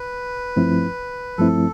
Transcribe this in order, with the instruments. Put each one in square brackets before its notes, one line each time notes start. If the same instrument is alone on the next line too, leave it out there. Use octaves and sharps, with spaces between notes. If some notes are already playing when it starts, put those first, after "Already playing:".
Already playing: [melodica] B4
[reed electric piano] G2 F3 A3 C4 E4
[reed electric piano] G2 F3 A3 C4 E4 [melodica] A4